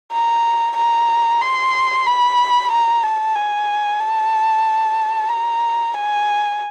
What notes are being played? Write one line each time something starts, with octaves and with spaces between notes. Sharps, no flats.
A#5
A#5
C6
B5
A#5
A5
G#5
A5
A#5
G#5